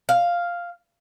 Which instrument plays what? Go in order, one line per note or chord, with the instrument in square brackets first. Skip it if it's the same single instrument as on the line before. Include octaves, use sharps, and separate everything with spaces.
[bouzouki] F5